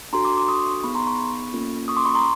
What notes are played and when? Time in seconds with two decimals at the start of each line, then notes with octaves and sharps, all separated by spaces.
0.13 D4 F#4 A4 A#5 C6
0.25 C6 D6
0.37 C6 D6
0.48 C#6 D#6
0.83 B3 D#4 G#4 B5 C#6
0.95 A#5 C6
1.07 B5 C#6
1.54 A#3 C#4 F4 A4
1.88 C#6 D#6
1.97 C6 D6
2.05 B5 C#6
2.15 A#5 C6